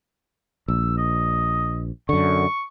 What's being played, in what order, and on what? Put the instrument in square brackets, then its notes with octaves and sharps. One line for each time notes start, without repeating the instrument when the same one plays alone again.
[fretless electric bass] A#1 [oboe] E6
[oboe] D#5
[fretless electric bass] F#2 D3 [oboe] C#6